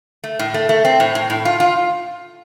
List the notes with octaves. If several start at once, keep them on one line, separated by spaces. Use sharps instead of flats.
A3
A2
A3
A3
C4
A2
A2
A2
F4
F4